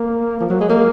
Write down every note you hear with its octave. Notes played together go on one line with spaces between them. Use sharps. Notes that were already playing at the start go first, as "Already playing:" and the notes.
Already playing: A#3
F3
F#3
G#3
A#3